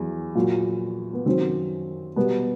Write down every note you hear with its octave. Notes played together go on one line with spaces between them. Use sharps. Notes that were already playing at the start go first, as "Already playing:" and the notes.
Already playing: E2 F#3
A#2 F#3
B3
F#2 D#3 F#3 C4
B2 G3 B3